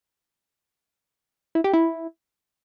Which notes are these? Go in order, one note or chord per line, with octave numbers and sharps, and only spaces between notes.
E4
G4
E4